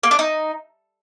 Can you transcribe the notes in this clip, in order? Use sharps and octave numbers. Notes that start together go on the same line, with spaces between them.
A#3
D4
D#4